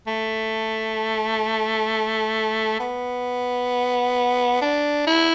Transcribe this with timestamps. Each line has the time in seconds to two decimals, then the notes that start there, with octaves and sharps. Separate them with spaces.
0.07 A3
2.80 B3
4.61 D4
5.07 E4